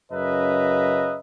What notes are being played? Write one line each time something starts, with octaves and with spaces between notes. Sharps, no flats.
F#2 C#3 B4 D#5 E5 A#5